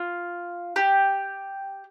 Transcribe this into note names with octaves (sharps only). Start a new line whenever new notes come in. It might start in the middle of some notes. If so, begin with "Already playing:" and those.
Already playing: F4
G4